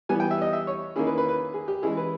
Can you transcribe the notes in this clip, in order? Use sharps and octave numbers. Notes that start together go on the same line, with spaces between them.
E3 G3 B3 G#5
G5
E5
D#5
E5
C#5
D#3 A#3 C#4 E4 G#4
B4
B4
B4
G#4
G4
E3 G#3 C#4 E4 G#4
B4